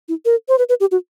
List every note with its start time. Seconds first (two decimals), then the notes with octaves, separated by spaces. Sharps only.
0.09 E4
0.25 A#4
0.49 C5
0.58 B4
0.69 B4
0.80 G4
0.91 F#4